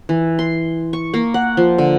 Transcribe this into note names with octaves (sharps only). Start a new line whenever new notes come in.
E3
C6
C#6
A#3
F#5
F3
D3